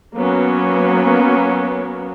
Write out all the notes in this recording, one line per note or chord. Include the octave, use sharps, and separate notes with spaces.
F#3 A#3 B3 C#4